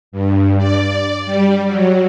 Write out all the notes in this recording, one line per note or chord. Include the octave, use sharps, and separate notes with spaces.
G2
D5
G3
F#3